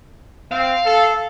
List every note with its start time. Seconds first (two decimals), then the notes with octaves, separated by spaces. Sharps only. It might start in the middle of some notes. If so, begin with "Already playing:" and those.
0.52 C4 F5
0.86 A4